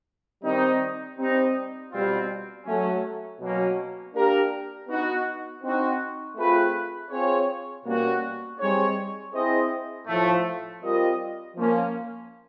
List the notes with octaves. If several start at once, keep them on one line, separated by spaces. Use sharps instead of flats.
D#3 G3 C4 D#4
G3 C4 D#4
B2 G3 C4 F4
F#3 A3 C#4
B2 F#3 A#3 C#4
A#3 D4 G4 A#4
B3 D#4 F#4
C4 D#4 F#4
A3 C4 F4 G#4 B4
C4 F4 G#4 C#5
B2 G3 A#3 C#4 F#4
G3 C4 D#4 G#4 C#5
C4 E4 G#4 C5 D#5
A2 F3 A3
G3 C4 F4 A#4 D#5
F3 A#3 C#4